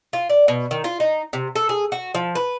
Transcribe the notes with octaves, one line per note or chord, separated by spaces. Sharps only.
F4
D5
B2
D#3
F4
D#4
C3
A4
G#4
F#4
F3
B4